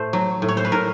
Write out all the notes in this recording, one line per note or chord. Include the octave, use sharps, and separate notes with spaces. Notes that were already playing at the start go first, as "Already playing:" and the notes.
Already playing: A2 A3 C5
F#3
A2
C#5
C5
B4
A2 A#4